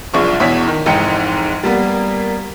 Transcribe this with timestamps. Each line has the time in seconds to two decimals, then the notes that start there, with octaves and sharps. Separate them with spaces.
0.14 F#1 C2 F3 D4 G#4 C#6
0.40 E2 B2 E4 C#5 B6
0.68 D#3
0.86 F1 G#2 E3 D#4 G5 C#7
1.63 G3 A#3 B3